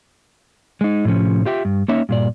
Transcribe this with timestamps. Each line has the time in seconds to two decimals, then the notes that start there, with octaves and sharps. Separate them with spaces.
0.81 G#3 D#4
1.05 A2 C3 F3 C#4
1.45 F4 G4 E5 G5
1.65 G2
1.88 A#3 C#4 D#4 C#5 E5
2.09 G2 A#2 D5